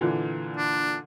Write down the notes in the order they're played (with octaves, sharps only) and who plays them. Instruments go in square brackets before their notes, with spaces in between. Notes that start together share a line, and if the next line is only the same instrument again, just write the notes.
[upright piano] A#2 D3 E3
[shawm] D4